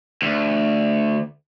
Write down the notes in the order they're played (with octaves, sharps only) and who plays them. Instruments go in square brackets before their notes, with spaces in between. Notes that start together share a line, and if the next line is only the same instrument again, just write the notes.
[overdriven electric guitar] D2